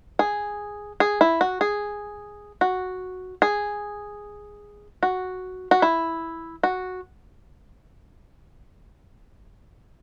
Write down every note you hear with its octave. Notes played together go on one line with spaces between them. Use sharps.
G#4
G#4
E4
F#4
G#4
F#4
G#4
F#4
F#4
E4
F#4